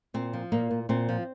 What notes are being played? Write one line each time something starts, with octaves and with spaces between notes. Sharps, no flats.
A#2 C4
F3
A#2 A#3
A#2
A#2 C4
F3